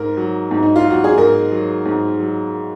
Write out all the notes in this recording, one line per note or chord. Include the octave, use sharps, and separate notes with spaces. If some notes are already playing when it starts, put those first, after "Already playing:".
Already playing: G#2 A#4
F#3
G#2
D#4
F4
F#3
F#4
G#4
G#2 A#4
F#3
G#2
F#3